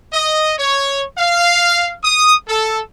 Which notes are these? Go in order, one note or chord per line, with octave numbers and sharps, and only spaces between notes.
D#5
C#5
F5
D#6
A4